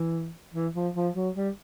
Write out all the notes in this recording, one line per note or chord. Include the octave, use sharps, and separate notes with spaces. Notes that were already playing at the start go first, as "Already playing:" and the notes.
Already playing: E3
E3
F3
F3
F#3
G3